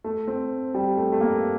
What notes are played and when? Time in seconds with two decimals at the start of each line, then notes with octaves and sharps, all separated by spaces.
0.04 A3
0.28 C4
0.74 G3
0.97 A3
1.12 A3
1.21 A#3